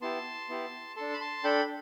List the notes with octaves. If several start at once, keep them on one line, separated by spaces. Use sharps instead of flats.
B3 E4 G4 A5 C6
B3 E4 G4
D4 A4 A5 C6
B5
A5 C6
D4 A4 G5 B5